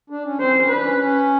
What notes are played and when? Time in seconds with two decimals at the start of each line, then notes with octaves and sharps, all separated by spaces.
0.10 D4
0.24 C#4
0.40 C4 C5
0.54 C#4
0.67 D4 B4
0.81 C#4
0.98 C#4